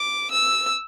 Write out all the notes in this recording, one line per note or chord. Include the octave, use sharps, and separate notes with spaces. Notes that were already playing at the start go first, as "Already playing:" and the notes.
Already playing: D6
E6